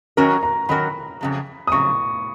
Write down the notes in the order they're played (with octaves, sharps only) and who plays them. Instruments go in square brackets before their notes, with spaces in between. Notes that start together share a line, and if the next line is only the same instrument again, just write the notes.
[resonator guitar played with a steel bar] D#3 F#3 C#4 F#4 A#4 [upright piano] A#5
[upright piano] A#5
[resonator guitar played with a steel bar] D#3 F#3 C#4 F#4 A#4 [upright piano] B5
[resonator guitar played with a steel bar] F2 C#3 F#3
[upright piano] D#6
[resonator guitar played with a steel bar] F2 C#3 F#3 [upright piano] C#6